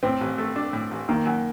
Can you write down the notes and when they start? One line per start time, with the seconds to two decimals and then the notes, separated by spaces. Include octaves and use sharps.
0.03 A2 C4
0.21 A1
0.38 A3
0.56 D4
0.73 A2
0.91 A1
1.09 D#3 A#3
1.26 F#2